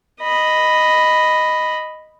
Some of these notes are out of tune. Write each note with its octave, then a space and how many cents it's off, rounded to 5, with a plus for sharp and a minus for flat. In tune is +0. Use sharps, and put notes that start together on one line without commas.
D#5 +0 B5 +0